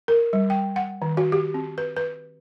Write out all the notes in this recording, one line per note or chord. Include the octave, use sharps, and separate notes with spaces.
A#4
G3
G5
F#5
D#3
F#4
G4
C4
B4
B4